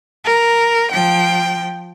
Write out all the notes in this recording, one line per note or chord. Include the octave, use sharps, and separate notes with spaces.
A#4
F3 G5